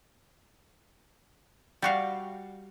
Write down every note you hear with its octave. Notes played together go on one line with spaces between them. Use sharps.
G3 F#4 F5